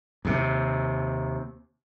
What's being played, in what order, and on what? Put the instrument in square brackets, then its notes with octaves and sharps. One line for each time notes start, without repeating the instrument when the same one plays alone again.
[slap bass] D#2 C3